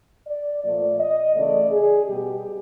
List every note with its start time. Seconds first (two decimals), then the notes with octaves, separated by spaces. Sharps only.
0.28 D5
0.63 A#2 F3 A3 D5
1.00 D#5
1.35 C#3 E3 A3 D5
1.71 G#4
2.07 B2 G3 G4